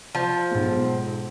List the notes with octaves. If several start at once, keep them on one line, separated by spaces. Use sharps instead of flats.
F3
B1 G#2